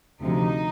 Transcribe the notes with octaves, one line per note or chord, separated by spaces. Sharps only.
D2 C3 F3 D#4